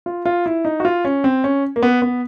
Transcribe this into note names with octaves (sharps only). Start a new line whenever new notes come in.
F4
F4
E4
D#4
F#4
F4
C#4
C4
C#4
A#3
B3
B3